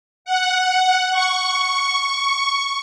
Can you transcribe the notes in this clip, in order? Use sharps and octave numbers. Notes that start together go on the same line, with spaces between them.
F#5
C#6